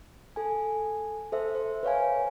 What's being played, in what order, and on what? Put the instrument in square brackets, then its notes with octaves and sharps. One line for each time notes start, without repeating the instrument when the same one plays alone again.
[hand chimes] A4 G#5
A4 C5 E5
C5
B4 C#5 F5 G#5